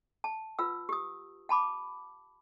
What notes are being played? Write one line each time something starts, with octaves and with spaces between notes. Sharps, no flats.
A5
F4 B4 F#5 E6
G4 D#6
F#5 A5 B5 D6